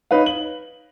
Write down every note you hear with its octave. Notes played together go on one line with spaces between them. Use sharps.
D#4 B4 C#5 F5
F#7